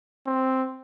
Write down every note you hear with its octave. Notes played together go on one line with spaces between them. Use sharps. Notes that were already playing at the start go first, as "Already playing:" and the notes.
C4